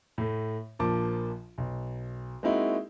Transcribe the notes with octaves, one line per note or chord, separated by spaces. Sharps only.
A2 A3
A#1 F3 A#3 A5 D6
B1
G#3 A#3 C4 D#4 E4 F#4